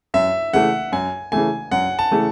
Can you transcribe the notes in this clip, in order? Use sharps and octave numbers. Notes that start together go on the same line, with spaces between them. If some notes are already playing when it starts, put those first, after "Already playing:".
F#2 E5
C#3 E3 A3 F#5
F#2 G#5
C#3 E3 A3 G#5
F#2 F#5
A5
C#3 E3 A3